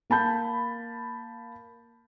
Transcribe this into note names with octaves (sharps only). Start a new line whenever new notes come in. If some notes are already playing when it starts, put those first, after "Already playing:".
A#3 A5 B5 G6